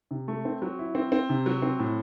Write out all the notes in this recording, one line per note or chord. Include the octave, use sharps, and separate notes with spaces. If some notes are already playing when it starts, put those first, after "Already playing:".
C3
A3
C4
F#3
E4
C4
C4
C3
F#3
C4
A2